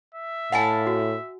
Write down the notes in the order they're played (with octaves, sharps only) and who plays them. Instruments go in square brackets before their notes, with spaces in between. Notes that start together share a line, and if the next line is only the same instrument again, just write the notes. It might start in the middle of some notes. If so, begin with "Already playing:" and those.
[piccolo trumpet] E5
[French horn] A2 [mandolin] F5 A5 B5 [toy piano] F#5 G#5
[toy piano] F#4